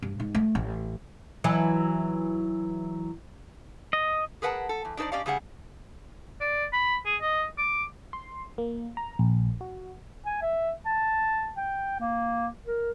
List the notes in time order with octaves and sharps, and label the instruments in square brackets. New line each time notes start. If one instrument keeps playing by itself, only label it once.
[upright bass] G2
G#2
A3
A1
[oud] E3 F#3
[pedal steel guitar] D#5
[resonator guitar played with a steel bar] G#4 A#4 B4 F#5 G#5 A5
A4
E2
D4 D#4 A4 C5 D5
C#4 G4 D5 D#5 F5
C#3 G3 G#4 F#5
[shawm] D5
B5
G#4
D#5
D6
[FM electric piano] C6
A#3
A#5
A#1
F#4
[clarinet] G#5
E5
A5
G5
A#3
A#4